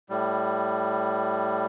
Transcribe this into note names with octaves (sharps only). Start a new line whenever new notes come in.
A2 G3